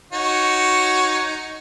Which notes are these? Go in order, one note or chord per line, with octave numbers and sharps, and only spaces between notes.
D#4 F#4 C#5